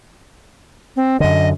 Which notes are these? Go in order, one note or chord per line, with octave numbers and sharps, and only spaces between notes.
C4
F#2 D3 D#5